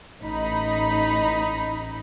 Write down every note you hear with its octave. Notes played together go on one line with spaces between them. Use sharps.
A1 D#4 B5